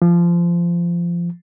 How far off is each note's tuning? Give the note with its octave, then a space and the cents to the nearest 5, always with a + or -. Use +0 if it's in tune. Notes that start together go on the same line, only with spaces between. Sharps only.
F3 -20